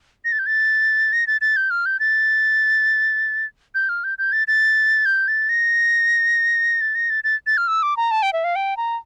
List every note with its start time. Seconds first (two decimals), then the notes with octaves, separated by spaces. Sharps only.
0.25 A#6
0.32 A6
0.39 G6
0.46 A6
1.13 A#6
1.27 A6
1.41 A6
1.56 G6
1.70 F6
1.86 G6
2.00 A6
3.75 G6
3.89 F6
4.04 G6
4.18 G6
4.32 A6
4.48 A6
5.06 G6
5.28 A6
5.49 A#6
6.81 A6
6.95 A#6
7.10 A6
7.24 A6
7.47 A6
7.57 F6
7.68 E6
7.83 D6
7.97 A#5
8.11 A5
8.23 G5
8.33 E5
8.44 F5
8.56 G5
8.77 A#5